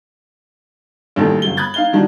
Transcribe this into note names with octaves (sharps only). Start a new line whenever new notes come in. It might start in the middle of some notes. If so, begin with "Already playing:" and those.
A1 A#2 D#3 G3 A4
G1 F#2 G7
B5 D#6 F#6 G#6 A6
D#4 F5 G7
D#3 E3 G3 D4 D#4 F#4